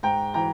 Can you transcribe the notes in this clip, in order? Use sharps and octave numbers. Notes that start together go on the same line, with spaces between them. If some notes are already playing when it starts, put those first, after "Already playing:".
G#2 G5 A#5
E3 G5 A#5